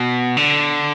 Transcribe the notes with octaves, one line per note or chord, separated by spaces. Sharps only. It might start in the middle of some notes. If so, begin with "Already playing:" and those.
Already playing: B2
D3